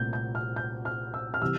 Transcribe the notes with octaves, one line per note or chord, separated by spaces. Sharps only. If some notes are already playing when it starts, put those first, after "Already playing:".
Already playing: C2 A#2 A3 C4 G6
G6
F6
G6
F6
E6
F6
C3 E3 G3 E6